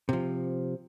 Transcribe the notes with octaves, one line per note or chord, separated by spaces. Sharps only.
C3 F3